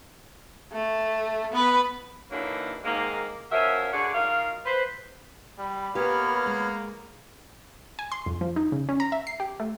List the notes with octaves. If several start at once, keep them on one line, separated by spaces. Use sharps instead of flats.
A3
B3 B4
D3 E3 F#3 A#3 D4 D#4
G#2 D#3 G#3 A#3
F3 C#4 F#4 A#4 E5
D3 F#4 G#4 C#5 D5 F#5
F#3 D#4 F4 A#4 F5
B4 C5
G3 B5
A#3 B3 G4 B4 C#5 F6
G#3
G#5
C6
F2
F3
D#4
C#3
C#4
A#5
E5
C7
G4
A3